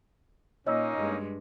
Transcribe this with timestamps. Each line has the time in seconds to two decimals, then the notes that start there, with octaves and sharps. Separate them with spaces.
0.67 A#2 A#3 C#4 D#4 C#5 D#5 E6
0.97 G2 G3 G#3